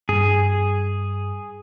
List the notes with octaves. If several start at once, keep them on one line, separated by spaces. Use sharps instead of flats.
G2 G#4